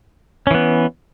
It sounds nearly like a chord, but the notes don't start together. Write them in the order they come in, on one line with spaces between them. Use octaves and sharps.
C#4 E3 B3